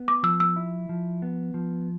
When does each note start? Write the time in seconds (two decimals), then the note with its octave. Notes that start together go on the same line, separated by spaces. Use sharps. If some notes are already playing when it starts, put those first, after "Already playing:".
Already playing: B3
0.08 D6
0.23 F3 E6
0.40 E6
0.56 E4
0.89 F3
1.22 B3
1.54 F3